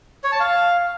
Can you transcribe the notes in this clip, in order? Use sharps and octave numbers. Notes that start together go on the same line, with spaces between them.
C#5
A5
F5